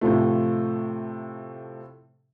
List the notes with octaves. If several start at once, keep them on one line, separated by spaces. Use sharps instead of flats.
A2 C3 F3 A3